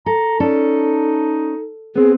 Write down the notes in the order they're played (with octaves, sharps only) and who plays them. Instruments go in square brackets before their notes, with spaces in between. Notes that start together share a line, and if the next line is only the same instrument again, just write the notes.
[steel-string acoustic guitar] A4 [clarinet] A#5
[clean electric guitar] C#4 D5 [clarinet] D#4 [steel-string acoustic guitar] A4
[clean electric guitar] B3 C4 [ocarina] G#4